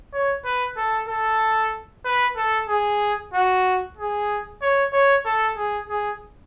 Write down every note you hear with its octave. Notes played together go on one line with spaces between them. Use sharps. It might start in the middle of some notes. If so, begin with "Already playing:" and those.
C#5
B4
A4
A4
B4
A4
G#4
F#4
G#4
C#5
C#5
A4
G#4
G#4